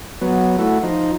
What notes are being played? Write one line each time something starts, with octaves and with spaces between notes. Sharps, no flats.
F#3 B3
A3 E4 F#4
F3 D#4